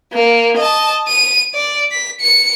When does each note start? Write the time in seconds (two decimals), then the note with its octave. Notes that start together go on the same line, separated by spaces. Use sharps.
0.14 A#3
0.57 D#5 A5
1.08 D#7
1.54 D5
1.92 B6
2.21 C#7